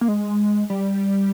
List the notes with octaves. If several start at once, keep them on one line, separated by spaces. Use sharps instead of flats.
A#3
G#3
G3